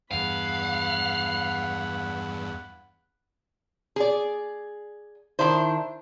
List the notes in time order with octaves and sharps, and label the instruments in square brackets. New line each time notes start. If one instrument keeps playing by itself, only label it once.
[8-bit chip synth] E2 G2 [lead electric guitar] F5 [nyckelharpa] F#5 B5
[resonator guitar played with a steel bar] G#4 D5
D#3 D4 E4 C5